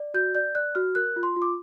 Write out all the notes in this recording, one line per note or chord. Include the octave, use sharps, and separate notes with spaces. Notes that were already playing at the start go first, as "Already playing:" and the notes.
Already playing: D5
F#4 G6
D5 G6
D5 F#6
F#4 F6
A#4 F#6
F4
C6
F4
D6